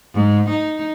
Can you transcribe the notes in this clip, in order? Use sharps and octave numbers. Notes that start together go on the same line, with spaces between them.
G#2
D#4